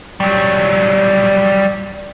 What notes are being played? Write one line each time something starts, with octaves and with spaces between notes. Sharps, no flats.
F#3 G3